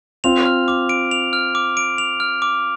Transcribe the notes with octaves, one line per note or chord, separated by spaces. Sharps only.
C4 F4 F7
F6
D6
D7
F7
F6
D6
D7
F7
F6
D6